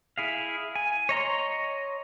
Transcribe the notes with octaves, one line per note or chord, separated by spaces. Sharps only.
E4 G#4 F5
G#5
C#5 D#5 A#5 C6